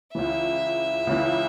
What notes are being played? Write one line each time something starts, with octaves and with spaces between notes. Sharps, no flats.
C#2 C#3 E3 E5
C#2 C#3 E3